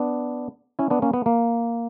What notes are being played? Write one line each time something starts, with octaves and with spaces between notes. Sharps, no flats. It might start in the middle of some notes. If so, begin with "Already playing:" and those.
Already playing: B3 D4
C#4 E4
B3 D4
A#3 C#4
B3
A#3